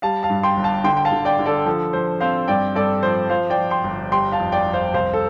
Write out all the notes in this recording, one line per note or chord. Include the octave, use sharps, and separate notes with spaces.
G3 F5 A5
F5 A5
G2
G5 C6
G1
F5 A5
D3 G5 C6
G5
F5 A5
D3
D5 G5
D3
A4 D5
F3 A4
F3 C5
C4 C5 F5
G2 D5 G5
G2 A4 D5
F3 C5
F3 C5 F5
D5 G5
F3
G5 C6
G1
G3 G5 C6
F5 A5
F2
D5 G5
F2
C5 F5
C2 C5 F5
A4